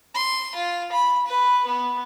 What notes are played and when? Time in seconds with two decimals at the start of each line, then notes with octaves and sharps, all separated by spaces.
0.14 C6
0.55 F4
0.92 B5
1.27 B4
1.67 B3